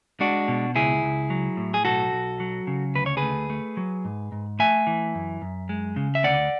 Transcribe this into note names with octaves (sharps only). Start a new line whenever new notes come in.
G#3 D4 F#4
B2
C#2 E4 G#4
C#2
F#3
A2
G#4
B1 F#4 A4
B1
F#3
C#3
D2 B4
C#5
G#4 B4
A3
A3
F#3
G#2
G#2
A3 E5 G#5
E3
F#2
F#2
G#3
C#3
E5
D2 D5 F#5